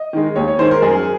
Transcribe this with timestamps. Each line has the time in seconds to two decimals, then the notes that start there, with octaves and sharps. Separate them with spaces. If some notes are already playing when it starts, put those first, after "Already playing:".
Already playing: D#5
0.13 D#3 G#3
0.36 D#2 C#5
0.48 C#5
0.59 D#3 G#3 C5
0.71 A#4
0.82 F#2 G#4